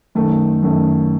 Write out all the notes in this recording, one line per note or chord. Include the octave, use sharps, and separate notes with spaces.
F#2 D#3 A3
F#2 D#3 A3